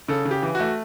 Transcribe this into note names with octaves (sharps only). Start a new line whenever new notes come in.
C#3 A4
C#3
G4
E3
F#4
A3